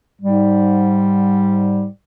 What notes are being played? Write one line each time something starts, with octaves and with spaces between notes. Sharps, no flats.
G#2 G3